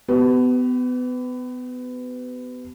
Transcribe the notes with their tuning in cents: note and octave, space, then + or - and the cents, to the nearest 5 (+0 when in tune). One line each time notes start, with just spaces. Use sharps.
B3 +25 G4 -35